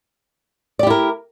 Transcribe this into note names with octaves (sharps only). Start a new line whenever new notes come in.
E4 G4 A#4 D5